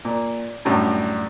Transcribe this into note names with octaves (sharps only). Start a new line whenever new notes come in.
A#2
F#2 A2 D3 G3 C#4